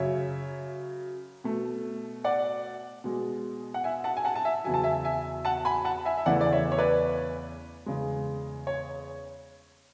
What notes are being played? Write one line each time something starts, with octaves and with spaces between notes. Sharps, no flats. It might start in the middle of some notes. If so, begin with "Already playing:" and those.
Already playing: F#2 C#3 F#3 C#5 E5
B2 A3
D5 F#5
B2 G#3
F#5
E5 G#5
F#5 A5
G#5
F#5 A5
A5
E5 G#5
E2 C#3 F#3 G#5
A5
E5 G#5
E5 G#5
F#5 A5
G#5 B5
F#5 A5
E5 G#5
E5
E2 C#3 E3 A3 D5 F#5
D5
C#5 E5
C#5
B4 D5
E2 C#3 G#3
C#5